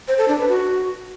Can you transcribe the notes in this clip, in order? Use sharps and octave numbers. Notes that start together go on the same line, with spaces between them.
C5
A4
D4
B4
F#4